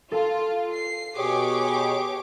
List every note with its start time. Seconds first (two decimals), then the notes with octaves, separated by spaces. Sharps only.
0.12 F4 A4 A5
0.72 C7
1.16 B2 G4 G#4 C#5 D6